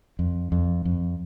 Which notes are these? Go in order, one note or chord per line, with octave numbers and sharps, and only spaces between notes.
F2
F2
F2